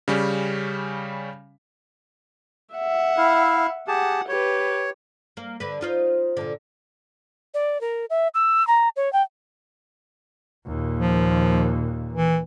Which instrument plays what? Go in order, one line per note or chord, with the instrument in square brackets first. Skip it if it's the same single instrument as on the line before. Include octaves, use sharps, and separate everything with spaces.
[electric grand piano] C#3 G3 C#4
[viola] E5 F#5
[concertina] E4 F5
[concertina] G4 G#4 A5 [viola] F#5
[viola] G4 B4 [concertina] C#5
[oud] A#3
D3 B4
D#4 F4 C5
A#2 D3
[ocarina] D5
A#4
E5
E6
A#5
C#5
G5
[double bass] D#2 A#2
[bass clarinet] F3
E3